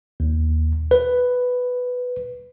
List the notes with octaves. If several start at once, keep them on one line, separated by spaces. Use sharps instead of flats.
D#2
B4